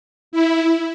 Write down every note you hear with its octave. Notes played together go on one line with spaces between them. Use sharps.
E4